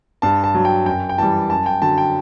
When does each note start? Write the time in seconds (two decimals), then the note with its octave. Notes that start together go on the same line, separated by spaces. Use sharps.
0.22 G2 A5
0.44 A5
0.55 F#3
0.65 G5
0.86 F#2 G5
1.09 G5
1.18 E3 G3 A5
1.50 F#2 A5
1.66 G5
1.82 D3 F#3 A5
1.98 G5